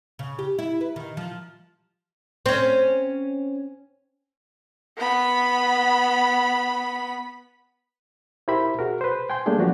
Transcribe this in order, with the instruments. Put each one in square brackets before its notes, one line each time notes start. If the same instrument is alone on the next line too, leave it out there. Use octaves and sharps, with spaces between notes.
[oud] C#3
G4
E4
B4
D#3
F3
C4 C#4
[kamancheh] B3 B5
[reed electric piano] E4 G4 A#4 C5 E5 B5
F#4 G#4 A#4
B4 C5
G5 G#5 C6 G6
G3 A3 A#3 D4 G#4 A4
F3 F#3 B3 F#4 G4 D5